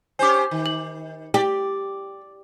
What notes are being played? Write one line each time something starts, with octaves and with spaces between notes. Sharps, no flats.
C#4 G4 C5 G#5 D6
D#3
F#7
G4 D5